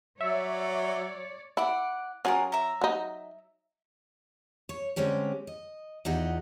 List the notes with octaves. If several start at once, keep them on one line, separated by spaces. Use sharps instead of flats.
F#3 C#5 D5 E5
E4 D5 F#5
F#3 C#4 F4 G#4 A#4
E5 A#5
F#3 D#4
C#5
D3 G3 G#3 C4 C#4 G4
D#5
E2 D#3 D#4 F4 G4 F#5